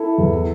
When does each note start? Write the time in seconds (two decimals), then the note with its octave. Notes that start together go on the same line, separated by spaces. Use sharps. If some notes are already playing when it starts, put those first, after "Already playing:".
Already playing: E4 A4
0.18 E2